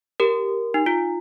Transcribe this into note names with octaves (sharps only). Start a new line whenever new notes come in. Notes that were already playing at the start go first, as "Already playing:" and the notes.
G4 A#4
D#4
F4